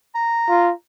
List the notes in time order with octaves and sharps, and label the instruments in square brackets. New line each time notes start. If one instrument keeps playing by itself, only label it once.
[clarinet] A#5
[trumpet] F4